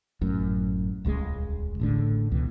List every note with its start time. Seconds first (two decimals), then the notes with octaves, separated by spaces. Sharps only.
0.21 G#1 F#2 A2
1.05 D#1 C#2 D#3 G#3
1.80 A1 A2 D3
2.32 C#2 B2 E3